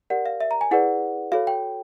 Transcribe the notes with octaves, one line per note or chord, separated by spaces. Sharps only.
G4 A#4 D5 F#5
F5
E5
A#5
G#5
E4 G#4 B4 D5 F#5
F#4 A4 C#5 F5
G5